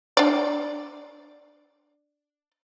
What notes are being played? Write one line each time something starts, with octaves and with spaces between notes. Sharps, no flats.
D4 D5